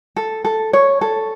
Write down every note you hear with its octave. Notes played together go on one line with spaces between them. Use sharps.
A4
A4
C#5
A4